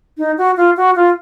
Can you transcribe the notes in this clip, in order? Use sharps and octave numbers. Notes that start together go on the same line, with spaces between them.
D#4
F#4
F4
F#4
F4